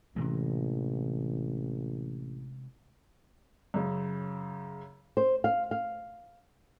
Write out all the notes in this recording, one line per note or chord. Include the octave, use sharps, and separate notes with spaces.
A1 C3 E3 G#3
F#2 C#3
C5
F5
F5